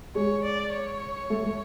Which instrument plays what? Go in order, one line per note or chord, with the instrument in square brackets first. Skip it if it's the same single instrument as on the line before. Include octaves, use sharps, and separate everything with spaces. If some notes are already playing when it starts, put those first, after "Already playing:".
[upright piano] G#3 [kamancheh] C#5
[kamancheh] D5
C#5
[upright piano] A3
A3